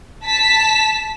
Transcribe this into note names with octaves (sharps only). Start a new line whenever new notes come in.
A5 B6